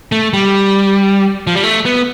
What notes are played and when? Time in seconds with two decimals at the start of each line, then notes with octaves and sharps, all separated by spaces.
0.12 A3
0.33 G3
1.47 F3
1.55 G3
1.64 A3
1.86 B3